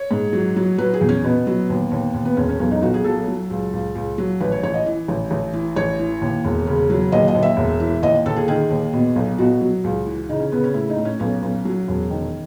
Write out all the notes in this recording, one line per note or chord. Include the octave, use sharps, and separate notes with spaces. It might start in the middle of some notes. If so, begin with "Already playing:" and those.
Already playing: C#5
G#2
F#3
F#3
F#3 B4
G#4
E2
C#4
B2 B3
F#3
D#2
D#2
D#2
B3
E1 C#4
C#4
B1 C#4
D#4
B1 F#4
G#4
F#3 A4
F#3
C#2
C#2
C#2
F#3
A1 B4
C#5
A1 C#5
D#5
E3
A1
A1
E3
A1 C#5
E3
D#2
E1
C#3
F#3
D#2 D#5
D#5
D#2
E5
E1
E3
D#2 D#5
D#2 A4
G#4
D#3 G#4
D#2
B2
B1
B2 F#4
F#3
C#2
E3
C#3 D#4
C#4
C#3 B3
C#4
A2 E4
D#4
A2
C#4
B1 C#4
B1
F#3
E1
D#3